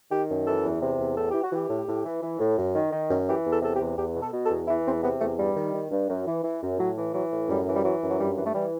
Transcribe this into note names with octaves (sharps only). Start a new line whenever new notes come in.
D#3 G4
F#2
E3 A4
E2
C3
E2
A2 A4
E3 G4
F#4
E3 G4
A2
A2
E3
E3
A2
F#2
D#3
D#3
F#2
E3 G4
E2
A4
C3 A4
G4
E2
E2 G4
B2
A4
B2
A4
E2
E3 E4
E2 C4
C3 B3
E2 A3
G2 G3
D#3
D#3
G2
F#2
E3
E3
F#2
A2 F#3
E3
E3 F#3
A2
F#2 G3
E3
G3
E3 F#3
F#2
F#3
G2 G3
E3
A3
E3 G3